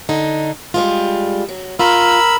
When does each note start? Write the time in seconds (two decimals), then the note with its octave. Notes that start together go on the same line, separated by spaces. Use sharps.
0.09 D3 D#4
0.74 G3 G#3 F4
1.49 F#3
1.79 F4 A#4 B5 E6